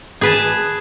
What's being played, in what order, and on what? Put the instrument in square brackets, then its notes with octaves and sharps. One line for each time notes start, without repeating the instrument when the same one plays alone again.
[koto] G#4 B4 A5